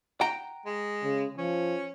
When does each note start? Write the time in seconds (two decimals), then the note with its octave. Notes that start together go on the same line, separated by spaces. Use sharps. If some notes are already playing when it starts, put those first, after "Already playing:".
0.21 F#5 G5 A#5
0.66 G#3
1.03 C#3
1.38 F3 C#4